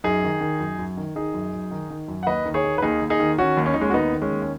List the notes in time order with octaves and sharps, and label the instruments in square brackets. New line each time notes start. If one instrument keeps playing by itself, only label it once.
[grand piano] F#2 D#4 G#4
D#3
D#3
F#2
F#2
D#3
D#3 D#4 G#4
F#2
F#2
D#3
D#3
F#2
F#5
D#2 B4 D#5
D#3
G#4 C#5
D#3
B4
D#2 D#4 G#4
D#2
D#4 G#4
D#3
D#3 C#4 F#4
D#2
C#4
D#2 D#4
G#3 C#4
F#4
D#3 B3 D#4
D#3
G#3 C#4
D#2
C#4